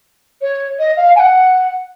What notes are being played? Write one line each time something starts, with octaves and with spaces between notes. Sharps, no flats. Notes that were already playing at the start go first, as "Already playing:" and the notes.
C#5
D#5
F5
G#5
F#5